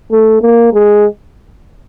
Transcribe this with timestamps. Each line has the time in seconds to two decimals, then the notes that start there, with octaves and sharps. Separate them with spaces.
0.12 A3
0.42 A#3
0.73 G#3